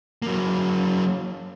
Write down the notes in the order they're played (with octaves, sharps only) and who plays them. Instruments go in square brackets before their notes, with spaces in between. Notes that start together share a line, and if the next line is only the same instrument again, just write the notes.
[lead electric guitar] F#3 A#3